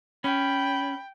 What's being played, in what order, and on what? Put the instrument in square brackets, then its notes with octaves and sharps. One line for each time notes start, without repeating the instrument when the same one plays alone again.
[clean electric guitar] C#4 [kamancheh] G5 [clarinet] B5